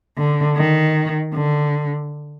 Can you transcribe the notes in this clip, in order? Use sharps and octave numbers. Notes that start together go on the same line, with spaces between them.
D3
D#3
D3